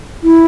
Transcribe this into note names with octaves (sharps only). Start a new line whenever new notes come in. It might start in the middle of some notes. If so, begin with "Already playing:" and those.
E4